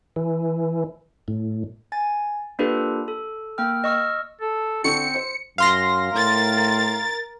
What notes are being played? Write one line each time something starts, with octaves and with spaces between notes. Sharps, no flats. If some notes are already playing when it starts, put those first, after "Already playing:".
E3
A2
G#5 A6
A#3 D4 F4 G4 A4 B4
A4
A#3 G5 F6
D#5 C#6 E6 F6
A4
D3 C4 A4 C#6 C#7
C5
F#2 F5 C6 A#6
A2 A#4 A6